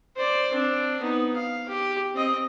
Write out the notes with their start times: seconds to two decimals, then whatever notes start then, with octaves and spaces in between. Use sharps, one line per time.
0.16 C5 D5
0.52 C4 D4
1.01 B3 D#4
1.36 F5
1.68 G4
2.15 C4 D#5